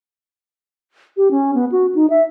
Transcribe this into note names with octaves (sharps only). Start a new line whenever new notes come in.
G4
C#4
B3
F#4
D#4
E5